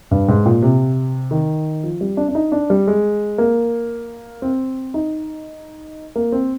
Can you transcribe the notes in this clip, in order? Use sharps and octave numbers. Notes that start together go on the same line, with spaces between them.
G2
G#2
A#2
C3
D#3
F3
G3
D4
D4
D#4
D4
G3
G#3
A#3
C4
D#4
A#3
C4